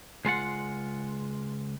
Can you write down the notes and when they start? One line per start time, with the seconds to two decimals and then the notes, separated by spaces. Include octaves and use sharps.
0.25 C#2 G#3 F4 F#5